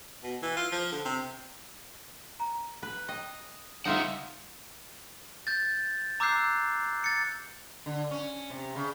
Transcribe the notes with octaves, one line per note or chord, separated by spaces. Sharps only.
B2
E3
F4
F3
D3
C3
A#5
B4
D#5 G5
C#3 G3 D#4 F4 E5 F#5
G6 A6
A#5 D6 E6 F#6 G6 C7
A6 C#7
D3
C#4
C3
C#3